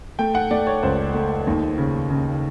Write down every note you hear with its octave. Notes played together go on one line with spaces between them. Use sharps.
A3 G5
F#5
A3 D5
C#5
C#2 C5
A3
D#2
C#3
C#3